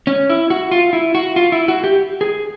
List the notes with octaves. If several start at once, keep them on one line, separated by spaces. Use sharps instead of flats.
C#4
E4
F#4
F4
E4
F#4
F4
E4
F#4
G4
G#4